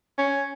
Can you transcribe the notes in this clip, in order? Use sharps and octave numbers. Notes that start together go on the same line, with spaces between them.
C#4